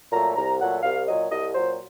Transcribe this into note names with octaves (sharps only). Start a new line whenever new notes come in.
A#2 F#3 A3 A#5
C2 A#5
A#2 F#3 A3 F#5
C2 F5
A#2 F#3 D#5
C2 D#5
A#2 F#3 C5